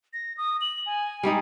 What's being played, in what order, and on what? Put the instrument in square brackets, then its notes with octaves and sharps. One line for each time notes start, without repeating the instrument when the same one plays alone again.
[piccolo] A#6
D#6
F#7
G#5
[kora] G3 G#3 D#4